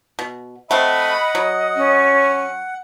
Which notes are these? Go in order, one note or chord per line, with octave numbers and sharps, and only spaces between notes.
B2
A3 C4 D#5 F#5 B5
F#3
C#4